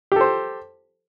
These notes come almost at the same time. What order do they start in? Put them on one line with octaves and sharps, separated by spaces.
G4 A4 C5